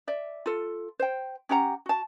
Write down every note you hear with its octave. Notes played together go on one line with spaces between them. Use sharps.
D5 E5
F4 A4
C5 G5
C#4 G4 F#5 A#5
F#4 A5